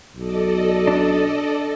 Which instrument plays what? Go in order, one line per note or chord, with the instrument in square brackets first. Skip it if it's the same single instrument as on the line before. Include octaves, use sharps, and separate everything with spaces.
[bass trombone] B1 [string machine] A4 D5 D#5
[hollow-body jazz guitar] D4